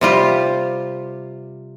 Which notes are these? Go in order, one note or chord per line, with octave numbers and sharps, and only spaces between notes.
C3 G3 F4 G4